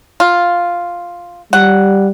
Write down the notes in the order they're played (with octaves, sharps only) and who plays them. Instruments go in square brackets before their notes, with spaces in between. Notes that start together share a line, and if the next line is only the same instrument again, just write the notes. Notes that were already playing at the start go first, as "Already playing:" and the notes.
[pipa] F4
[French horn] G3 [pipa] F#5